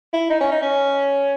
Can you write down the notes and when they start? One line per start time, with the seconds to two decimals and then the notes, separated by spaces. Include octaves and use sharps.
0.13 E4
0.30 D#4
0.41 C#4
0.52 D#4
0.62 C#4